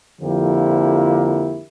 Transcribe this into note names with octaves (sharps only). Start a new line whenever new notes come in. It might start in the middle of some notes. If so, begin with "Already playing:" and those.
F2 D3 F3 A#3 E4 G4